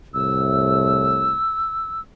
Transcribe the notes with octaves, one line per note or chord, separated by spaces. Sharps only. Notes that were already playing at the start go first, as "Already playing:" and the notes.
C2 A2 E6